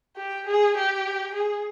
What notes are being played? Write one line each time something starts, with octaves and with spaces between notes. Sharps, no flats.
G4
G#4
G4
G#4